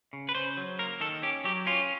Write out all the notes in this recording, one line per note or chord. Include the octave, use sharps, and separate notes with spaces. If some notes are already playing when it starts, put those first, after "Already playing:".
C#3
B4
C#3 C5
F#3
A#3 A#4
D#3 A4
C#4 G4
F#3 G4
C#4 F4